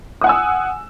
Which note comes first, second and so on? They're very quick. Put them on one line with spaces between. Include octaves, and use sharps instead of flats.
D#6 F#5 G#5 E6